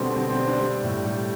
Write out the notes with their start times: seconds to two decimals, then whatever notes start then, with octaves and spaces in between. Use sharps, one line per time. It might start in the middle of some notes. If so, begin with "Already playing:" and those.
Already playing: B2 D3 G3 C4
0.15 G3 C4
0.30 C4
0.38 G3
0.46 D4
0.60 G3
0.84 A2
1.06 G3